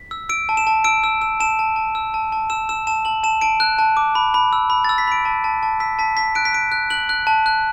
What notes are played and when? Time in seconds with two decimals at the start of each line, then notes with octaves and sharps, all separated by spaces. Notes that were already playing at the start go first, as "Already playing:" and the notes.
Already playing: B6
0.11 E6
0.29 E6 D7
0.49 A5
0.57 E7
0.67 A5
0.84 E6 D7
1.04 E6
1.22 E6
1.40 A5 E7
1.59 A5
1.76 A5
1.95 E6
2.14 A5
2.32 A5
2.50 E6 E7
2.69 E6 E7
2.87 A5 E7
3.05 A5 F#7
3.23 A5 E7
3.41 A5 D7
3.60 F#6
3.79 A5
3.97 D6
4.15 B5
4.34 B5
4.53 E6
4.70 B5
4.84 E6 A6
4.98 B6
5.07 B5 D7
5.25 A5
5.44 A5
5.63 A5
5.80 E6 B6
5.99 A5 B6
6.17 A5 B6
6.35 F#6 D7
6.45 B6
6.53 F#6 D7
6.72 F#6
6.90 F#6 F#7
7.09 F#6
7.27 A5
7.46 F#6